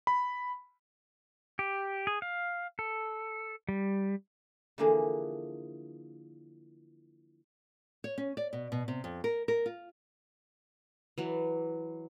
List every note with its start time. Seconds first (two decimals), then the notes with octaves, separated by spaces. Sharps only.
0.07 B5
1.59 G4
2.07 G#4
2.22 F5
2.79 A4
3.69 G3
4.78 D3 E3 F3 A#3 D4 G#4
8.04 C#5
8.18 C#4
8.37 D5
8.53 B2
8.72 B2
8.88 C3
9.04 F2
9.24 A#4
9.48 A#4
9.66 F4
11.18 E3 F#3